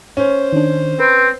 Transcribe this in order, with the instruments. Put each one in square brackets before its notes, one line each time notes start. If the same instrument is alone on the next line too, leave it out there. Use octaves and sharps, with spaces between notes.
[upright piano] C#4 [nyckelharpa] C5
[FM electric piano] D#3 D4
[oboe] C4 [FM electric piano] B4